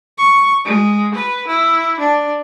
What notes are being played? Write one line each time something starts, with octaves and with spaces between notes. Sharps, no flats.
C#6
G#3
B4
E4
D4